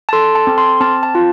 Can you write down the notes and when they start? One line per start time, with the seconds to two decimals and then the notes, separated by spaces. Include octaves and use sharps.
0.09 A5
0.13 A4 C6
0.35 A5
0.47 C4
0.58 C6
0.80 C4 A5
1.03 A5
1.15 F4